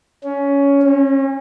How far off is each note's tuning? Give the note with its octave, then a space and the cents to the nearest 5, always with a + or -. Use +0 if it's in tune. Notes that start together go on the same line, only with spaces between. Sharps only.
C#4 +15
C#4 -35